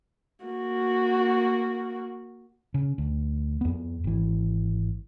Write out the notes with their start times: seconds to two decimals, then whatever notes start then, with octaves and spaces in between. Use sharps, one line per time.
0.45 A#3 F#4
2.74 C#3
2.98 D2
3.61 F2 B3
4.04 G#1 E3